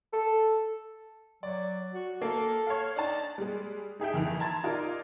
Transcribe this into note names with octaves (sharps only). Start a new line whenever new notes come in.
A4
F#3 D5
F#4
A#3 A4
C#5 F5
D4 D#4 A5
G3 G#3
D#4 G#4 E5 G5
F2 D#3 E3
A5 A#5 C6 G#6 A6
D#4 F4 A#4 D5